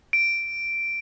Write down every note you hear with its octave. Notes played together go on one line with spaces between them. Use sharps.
D7